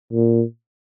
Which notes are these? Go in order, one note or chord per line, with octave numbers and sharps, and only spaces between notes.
A#2